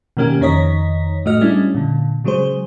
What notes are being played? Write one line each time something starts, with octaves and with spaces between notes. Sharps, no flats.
B2 D#3 A#3 C#4 G4
F2 D#3 D#4 C#5 D#5 B6
A2 A3 F#4 D#5 F6
G3 G#3 C#4 D4 E4
A#2 D3
C#3 F#3 G#3 G#4 C5